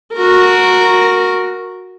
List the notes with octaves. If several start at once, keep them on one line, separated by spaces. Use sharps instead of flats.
F#4 A#4